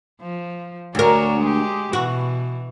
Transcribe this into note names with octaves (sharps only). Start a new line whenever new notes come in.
F3
D2 D4 F#4 A#4 C#5
G#3 G4
B2 E3 F#4